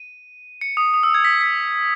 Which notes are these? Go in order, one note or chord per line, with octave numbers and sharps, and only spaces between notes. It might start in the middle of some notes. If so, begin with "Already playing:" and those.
Already playing: D#7
C#7
D#6
D#6
E6
G#6
B6
B6